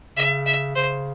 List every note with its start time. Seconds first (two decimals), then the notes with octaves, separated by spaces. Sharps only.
0.17 C#3 E5
0.46 E5
0.76 C#3 C5